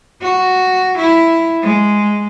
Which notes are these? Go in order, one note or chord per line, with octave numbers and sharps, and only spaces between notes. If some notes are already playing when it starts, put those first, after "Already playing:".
F#4
E4
G#3